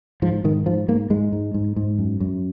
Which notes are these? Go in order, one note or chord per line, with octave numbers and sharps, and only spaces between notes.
G#2 F3
G#2 D#3
G#2 F3
G#2 A#3
G#2 G#3
G#2
G#2
G#2
F#2
F#2